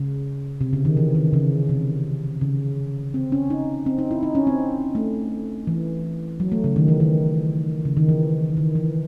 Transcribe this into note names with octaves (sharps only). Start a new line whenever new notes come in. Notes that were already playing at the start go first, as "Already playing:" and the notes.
Already playing: C#3
C3
C#3
D#3
E3
D#3
C#3
C3
C#3
C4
C#4
D#4
C4
D#4
E4
D#4
C#4
C4
A3
E3
F#3
A3
C#3
D#3
E3
D#3
C#3
D#3
E3
D#3
E3